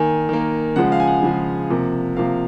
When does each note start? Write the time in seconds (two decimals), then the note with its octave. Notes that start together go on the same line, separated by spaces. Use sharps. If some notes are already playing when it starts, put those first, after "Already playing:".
Already playing: D#3 A#3 G#5
0.29 D#3 A#3
0.76 C#3 F3 G#3 F#5
0.92 F5
1.00 G#5
1.07 F#5
1.23 C#3 F3 G#3
1.70 C3 F3 A#3
2.17 C3 F3 A#3 F5